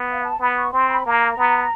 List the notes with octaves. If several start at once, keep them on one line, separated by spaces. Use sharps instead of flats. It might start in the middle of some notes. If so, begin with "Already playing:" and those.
Already playing: B3
F5
A5
B3 B5
C#6
C4 C6
B5
A#3 A#5
B3